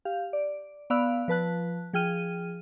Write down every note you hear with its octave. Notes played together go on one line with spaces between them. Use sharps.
G4 F5
D5
B3 D5 F5 B5 E6 F#6
F3 B4 A5 F#6
F3 G#4 G5 F6 D#7